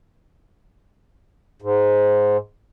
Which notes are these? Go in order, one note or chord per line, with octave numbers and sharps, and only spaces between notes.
G#2